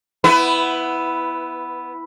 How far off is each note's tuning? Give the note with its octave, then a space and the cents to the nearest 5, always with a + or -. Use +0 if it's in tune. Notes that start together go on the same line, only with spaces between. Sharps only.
B3 +0 E4 +0 B4 +20